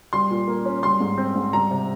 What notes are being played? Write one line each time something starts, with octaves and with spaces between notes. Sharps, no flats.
G3 C6
A#2
A#3
C#4
G3 C6
G#2
C4
G#2
G3 A#5
C3